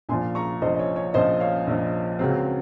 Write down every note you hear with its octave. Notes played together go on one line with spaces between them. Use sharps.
A#1 A#2 F3 G#5 C6
A#5 C#6
A#1 A#2 F3 C5 D#5
D#5
C#5
C#5
A#1 A#2 F3 C5 D#5
C#5 F5
A#1 A#2 F3
C#2 C#3 F#3 C4